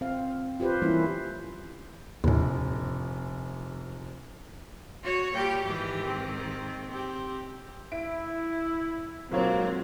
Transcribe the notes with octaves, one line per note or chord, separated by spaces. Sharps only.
C4 F5
F4 G4 B4 C5
E3 G3 A#3 C#4 E4
F1 A#1 D#2 A2
F#4 C#5
A#2 G3 G4 G5
G#2 D#3 E3 G4
C4
C4 G4
E4 E5 D7
B1 F#3 G#3 A#3 C4 F4 C#5